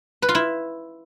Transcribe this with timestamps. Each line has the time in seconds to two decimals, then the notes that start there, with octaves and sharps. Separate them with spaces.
0.22 B4
0.29 F4
0.35 E4